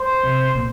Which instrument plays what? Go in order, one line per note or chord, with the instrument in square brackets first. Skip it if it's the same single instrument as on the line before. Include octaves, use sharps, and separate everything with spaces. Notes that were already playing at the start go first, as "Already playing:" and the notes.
Already playing: [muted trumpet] C5
[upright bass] C3
A#2